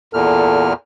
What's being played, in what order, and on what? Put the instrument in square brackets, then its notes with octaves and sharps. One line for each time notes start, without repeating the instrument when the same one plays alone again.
[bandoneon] E2 A#2 F6 [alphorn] A4